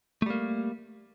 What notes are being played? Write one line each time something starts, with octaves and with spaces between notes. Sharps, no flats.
G3 A3 A#3